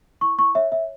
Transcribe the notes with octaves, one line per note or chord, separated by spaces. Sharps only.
E4 C#6
E4 C#6
C#5 E5
C#5 E5